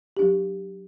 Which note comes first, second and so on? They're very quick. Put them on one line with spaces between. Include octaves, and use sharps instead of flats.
G4 D4 F#3